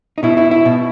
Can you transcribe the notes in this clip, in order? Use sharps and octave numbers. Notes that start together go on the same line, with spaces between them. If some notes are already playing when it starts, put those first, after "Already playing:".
D#4
B2 E4
E4
E4
B2